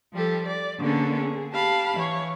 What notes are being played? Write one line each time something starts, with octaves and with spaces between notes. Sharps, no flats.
F3 G3 G4 A4
D5
D3 A#3 B3 C#4 G#4 A4
G#4
G4 F5 A5 B5
E3 C#5